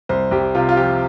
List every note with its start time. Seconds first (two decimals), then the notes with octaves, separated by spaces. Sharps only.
0.09 C2 C5
0.31 C2 G4
0.55 C3 F4
0.69 F4
0.77 F3 G4